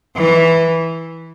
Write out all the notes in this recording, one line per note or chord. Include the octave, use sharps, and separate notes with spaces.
E3